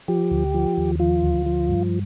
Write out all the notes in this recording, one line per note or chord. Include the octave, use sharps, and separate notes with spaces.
F3 G4
D2
F3
D#2
F3 F4
D2
F3
G2